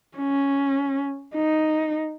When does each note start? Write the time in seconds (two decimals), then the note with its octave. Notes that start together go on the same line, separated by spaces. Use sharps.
0.17 C#4
1.36 D#4